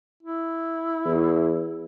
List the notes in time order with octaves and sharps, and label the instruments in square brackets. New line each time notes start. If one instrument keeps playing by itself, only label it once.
[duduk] E4
[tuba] E2